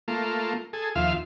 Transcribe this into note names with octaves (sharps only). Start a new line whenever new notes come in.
A3 A#3 F4
G#4 A4
D#2 F3 F4 E5 F5